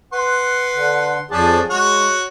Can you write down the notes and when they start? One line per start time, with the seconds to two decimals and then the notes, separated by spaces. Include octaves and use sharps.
0.13 B4 F#5 C6
0.75 D3
1.31 F2 F3 C#4 D4 G#4 A5
1.70 G#3 F#4 C#5 F#5